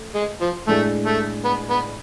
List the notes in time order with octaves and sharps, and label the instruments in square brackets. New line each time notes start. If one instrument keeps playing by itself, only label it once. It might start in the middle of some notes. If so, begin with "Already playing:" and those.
Already playing: [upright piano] A3
[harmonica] G#3
F3
[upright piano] A2 G#3 D4 G#4 [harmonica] A3
[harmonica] A3
B3
B3